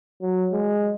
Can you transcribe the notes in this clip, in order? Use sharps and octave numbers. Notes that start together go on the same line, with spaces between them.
F#3
G#3